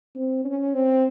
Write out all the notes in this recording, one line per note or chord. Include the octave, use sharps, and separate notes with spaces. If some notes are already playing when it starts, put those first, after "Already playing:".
C4
C#4
C4